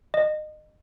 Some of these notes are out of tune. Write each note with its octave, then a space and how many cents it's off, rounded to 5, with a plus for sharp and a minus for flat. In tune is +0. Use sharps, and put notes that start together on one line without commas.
D#5 -25